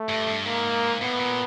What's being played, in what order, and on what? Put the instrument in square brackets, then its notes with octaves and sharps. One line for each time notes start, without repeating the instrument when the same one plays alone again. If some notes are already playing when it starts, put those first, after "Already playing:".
Already playing: [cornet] A3
[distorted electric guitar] G2
G2
[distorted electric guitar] G#2 [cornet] A#3
[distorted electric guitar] A2 [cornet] B3
[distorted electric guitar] A#2